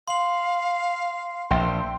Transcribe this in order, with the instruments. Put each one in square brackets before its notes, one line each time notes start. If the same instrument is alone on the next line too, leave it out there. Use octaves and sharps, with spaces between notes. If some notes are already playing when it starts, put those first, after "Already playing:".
[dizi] F5 [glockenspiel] C6 F#7
[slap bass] A#1 [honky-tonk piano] E5 G5 C6